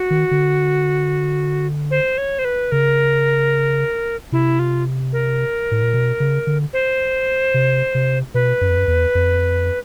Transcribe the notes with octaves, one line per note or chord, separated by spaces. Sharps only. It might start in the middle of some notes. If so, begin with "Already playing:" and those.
Already playing: F#4
D#3
D3
C5
C#5
C5
B4
C#3 A#4
C3 E4
F4
A#4
A2
A#2
B2
C#3
D3
C5
C3
C3
B2 B4
F#2
F2
F#2
E2
F2